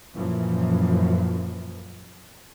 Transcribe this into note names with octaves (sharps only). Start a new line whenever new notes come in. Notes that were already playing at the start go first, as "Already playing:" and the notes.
F#2 A#2 E3 F3